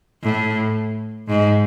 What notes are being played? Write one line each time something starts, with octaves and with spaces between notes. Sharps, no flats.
A2
G#2